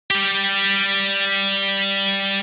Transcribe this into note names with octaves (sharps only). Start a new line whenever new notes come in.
G3 G4